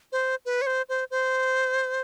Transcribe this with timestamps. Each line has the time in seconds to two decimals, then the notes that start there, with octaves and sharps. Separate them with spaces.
0.12 C5
0.45 B4
0.61 C#5
0.66 C5
0.89 C5
1.11 C5